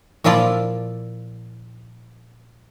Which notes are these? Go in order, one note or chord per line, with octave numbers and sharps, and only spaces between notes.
A#2 F3 E4 F4 D5